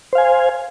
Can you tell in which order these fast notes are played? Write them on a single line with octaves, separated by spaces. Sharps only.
C5 F5 G#5